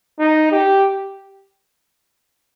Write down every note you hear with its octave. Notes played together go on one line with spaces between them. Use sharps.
D#4
G4